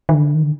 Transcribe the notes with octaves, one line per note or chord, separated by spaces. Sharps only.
D#3
D3
D#3
D3